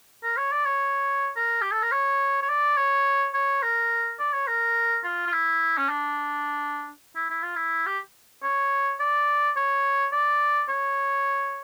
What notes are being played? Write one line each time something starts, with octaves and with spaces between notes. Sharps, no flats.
A#4
C#5
D5
C#5
A#4
G4
A4
A#4
C#5
C#5
D5
C#5
C#5
A#4
D5
C#5
A#4
F4
F4
E4
C#4
D4
E4
E4
F4
E4
G4
C#5
D5
C#5
D5
C#5